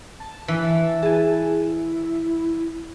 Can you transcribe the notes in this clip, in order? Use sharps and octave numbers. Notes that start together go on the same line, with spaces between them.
A5
E3
E4 G#4 G#5 A5